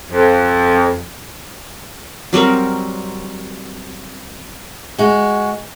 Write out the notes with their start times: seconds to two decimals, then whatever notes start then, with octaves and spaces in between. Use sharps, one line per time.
0.11 F2
2.33 F#3 G3 C4 A#4
4.98 G#3 F#4